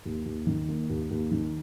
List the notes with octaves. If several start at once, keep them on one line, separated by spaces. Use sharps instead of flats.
D#2
D#2
D#3
A#3
D#2
D#2
D#3